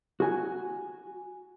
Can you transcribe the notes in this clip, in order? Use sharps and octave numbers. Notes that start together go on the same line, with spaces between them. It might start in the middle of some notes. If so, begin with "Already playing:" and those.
F#4 G#5